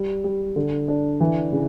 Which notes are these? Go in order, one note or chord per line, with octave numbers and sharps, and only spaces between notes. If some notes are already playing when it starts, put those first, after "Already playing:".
Already playing: G3
G3
D3
D4
E3
C#3